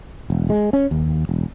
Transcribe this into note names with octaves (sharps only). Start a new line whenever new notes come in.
E1
G#3
C#4
D#2
E1